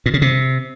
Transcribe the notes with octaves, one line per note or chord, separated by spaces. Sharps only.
A#2
C#3
C3